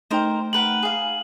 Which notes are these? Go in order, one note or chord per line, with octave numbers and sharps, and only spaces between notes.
A3 D#4 A#4 C5 D#5 G5
A#4 B4 F#5 F#7
G#4 F5